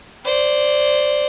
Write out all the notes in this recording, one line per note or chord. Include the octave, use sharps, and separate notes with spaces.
C5 D5